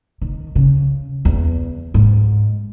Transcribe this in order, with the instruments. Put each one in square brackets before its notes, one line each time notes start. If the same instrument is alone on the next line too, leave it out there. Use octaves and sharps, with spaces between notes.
[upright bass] D#3
C#3
E2
G#2